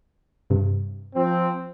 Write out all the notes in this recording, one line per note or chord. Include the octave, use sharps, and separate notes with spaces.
G2 C3
F3 C4